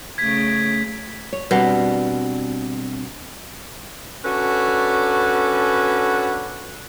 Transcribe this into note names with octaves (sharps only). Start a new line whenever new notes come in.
C#3 A3 G#6 B6
C#5
B2 G3 C4 D4
C#4 D4 F#4 A4 B4